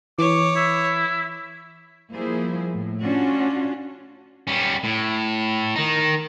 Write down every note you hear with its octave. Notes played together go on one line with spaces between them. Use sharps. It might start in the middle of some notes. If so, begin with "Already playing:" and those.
E3 C#5 D6
E4
F3 G3 A#3 E4 G#4 C5
A2
C#4 D4 F4 F#4
G3 C#4
A2
D#3 D#4